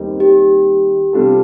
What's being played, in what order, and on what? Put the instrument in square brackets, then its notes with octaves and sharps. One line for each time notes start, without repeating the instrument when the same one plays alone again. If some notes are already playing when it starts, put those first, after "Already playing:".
Already playing: [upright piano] D#2 D#3 G3 C4 D#4
[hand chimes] G4
[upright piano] C3 G3 D4 F4 A4